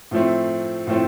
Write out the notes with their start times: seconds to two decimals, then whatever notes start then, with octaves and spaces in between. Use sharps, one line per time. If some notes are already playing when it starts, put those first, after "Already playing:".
0.11 A2 F3 A3 C4
0.87 A2 F3 A3 C4